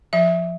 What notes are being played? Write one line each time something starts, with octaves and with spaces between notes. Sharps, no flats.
F3 E5